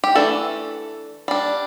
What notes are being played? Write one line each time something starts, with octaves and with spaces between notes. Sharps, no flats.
G4
E3 A3 D4 A4
G3 D4